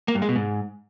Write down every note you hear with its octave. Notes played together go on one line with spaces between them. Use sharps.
A#3
G2
G#3
B2
G#2